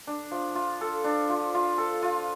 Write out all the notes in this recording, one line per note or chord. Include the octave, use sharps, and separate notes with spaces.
D4
F3
F4
A4
D4
F3
F4
A4
F4